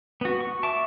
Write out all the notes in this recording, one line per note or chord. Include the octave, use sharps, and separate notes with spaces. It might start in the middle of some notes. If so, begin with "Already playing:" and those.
B3 F#4
C#6
E5 A5 C#6 D6